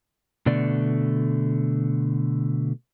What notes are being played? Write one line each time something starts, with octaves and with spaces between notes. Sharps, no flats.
B2 D3 A3 D5